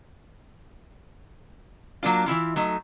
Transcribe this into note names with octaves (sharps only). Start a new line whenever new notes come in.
F#3 A#3 D4 F4
E3 C#4 E4 F4
F#3 A3 D#4